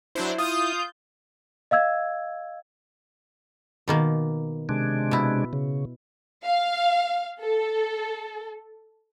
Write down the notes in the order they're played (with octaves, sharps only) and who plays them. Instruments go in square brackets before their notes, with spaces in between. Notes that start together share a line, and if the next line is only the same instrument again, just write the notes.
[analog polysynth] F#3 D4 C5 [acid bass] E4
[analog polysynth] F4 G6 [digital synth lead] D#6
[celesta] D#5 F5 E6 G#6
[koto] B2 D#3 A#3
[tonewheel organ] C3 G#3 D4
[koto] B2 E4
[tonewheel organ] C#3
[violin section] F5
A4